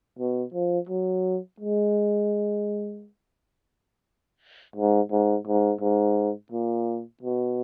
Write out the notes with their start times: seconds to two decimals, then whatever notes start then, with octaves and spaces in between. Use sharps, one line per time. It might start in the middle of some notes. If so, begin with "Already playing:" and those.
0.19 B2
0.54 F3
0.89 F#3
1.60 G#3
4.76 G#2
5.11 G#2
5.47 G#2
5.81 G#2
6.52 A#2
7.23 B2